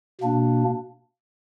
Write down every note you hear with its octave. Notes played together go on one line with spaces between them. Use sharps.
B2 A#3 D4